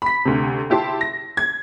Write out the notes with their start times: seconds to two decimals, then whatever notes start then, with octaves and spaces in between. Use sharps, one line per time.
0.02 B5 B6
0.25 D2 C3
0.70 E4 G4 A5 C6
1.01 A#6
1.37 G#6